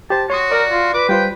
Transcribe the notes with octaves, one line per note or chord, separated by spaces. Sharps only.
G4 C5 A5
F#4 C#5 C6 D#6
A#4 D5
F4
B4 D6
G3 F4 C5 G5